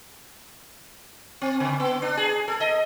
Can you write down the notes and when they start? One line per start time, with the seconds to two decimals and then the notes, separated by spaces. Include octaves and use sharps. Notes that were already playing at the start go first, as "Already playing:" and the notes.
1.41 C4
1.60 C#3
1.80 B3
2.02 D4
2.17 G#4
2.48 A4
2.60 D#5